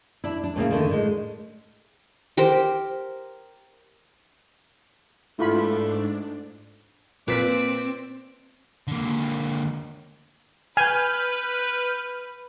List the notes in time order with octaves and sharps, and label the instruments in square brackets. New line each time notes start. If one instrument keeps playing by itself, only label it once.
[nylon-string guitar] D4 E4
D4
A2 C#3 A#3 E4
D3 D#3 A3
A2 G#3
[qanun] G4 A#4 C5
[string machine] G#2 D4 [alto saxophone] A3 [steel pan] E4 F4 B5
[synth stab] A#2 B6 [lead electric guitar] C4 [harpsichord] B4 [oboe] D5
[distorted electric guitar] D3 A#3
[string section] B4 [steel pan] G#5 [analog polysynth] F6 G6